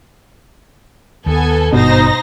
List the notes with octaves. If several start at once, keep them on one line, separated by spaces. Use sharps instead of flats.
D#2 B3 A4 G#5
G#1 G2 B2 D#4 C5 A#6